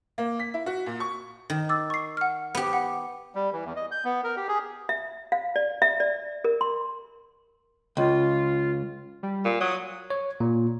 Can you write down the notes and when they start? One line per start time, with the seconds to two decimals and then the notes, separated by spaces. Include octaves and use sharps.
0.18 A#3
0.39 B6
0.54 E4
0.66 F#4
0.86 A#2
1.00 C#6
1.50 D#3
1.69 D6 E6 A6
1.90 C#6 C7
2.17 F#5 F6
2.55 B3 G4
2.73 F#5
3.35 G3
3.53 E3
3.65 E2
3.76 D#5
3.91 G6
4.05 B3
4.24 A#4
4.37 G4
4.48 G#4
4.89 E5
5.32 F5
5.56 D5
5.82 E5
6.00 D5
6.45 A#4
6.61 C6
7.97 C#2 F4
9.23 G3
9.45 A#2
9.60 F#3 D#6
10.10 C#5
10.40 A#2